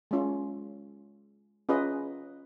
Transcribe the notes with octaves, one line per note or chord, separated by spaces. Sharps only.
G#3 C#4 F4
C#4 F4 G#4 B4 D#5